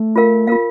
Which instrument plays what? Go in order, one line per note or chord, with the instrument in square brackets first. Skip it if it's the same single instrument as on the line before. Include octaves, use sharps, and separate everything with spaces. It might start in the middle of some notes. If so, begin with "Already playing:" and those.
Already playing: [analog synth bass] A3
[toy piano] F4 A#4 F5
[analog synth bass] A#3 [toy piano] F4 A#4 F5